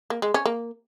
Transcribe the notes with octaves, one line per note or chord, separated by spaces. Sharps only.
A#3
G#3
C#4
A#3